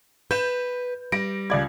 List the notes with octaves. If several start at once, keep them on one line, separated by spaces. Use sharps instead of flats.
B4 G6 E7
G3 A#6 D7
C#2 D5 G#6